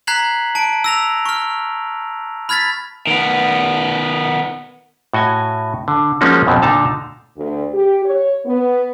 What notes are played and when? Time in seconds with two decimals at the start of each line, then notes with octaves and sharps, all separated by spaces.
0.07 A#5 F#6 G#6 B6 C7 F#7
0.55 A5 D7
0.84 E6 A#6 F7
1.26 C#6 F6
2.49 B5 F6 G#6 A6 B6
3.07 D#3 B3
5.14 A2 F#4 D#5 G#5
5.88 D3
6.21 F3 G#3 A#3 C#4 D#4 F#4
6.47 F2 B2 F3 F#3
6.62 A#2 D3 D#4 A5 A#5
7.37 D2
7.73 G4
8.03 C#5
8.46 B3